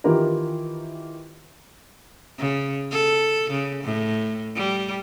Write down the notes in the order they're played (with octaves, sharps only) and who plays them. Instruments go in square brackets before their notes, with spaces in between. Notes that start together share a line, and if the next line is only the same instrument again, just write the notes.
[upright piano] D#3 E3 E4 F4 G4 A#4
[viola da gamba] C#3
A4
C#3
A2
G3